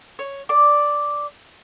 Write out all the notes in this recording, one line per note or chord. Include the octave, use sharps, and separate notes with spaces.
C#5
D5 D6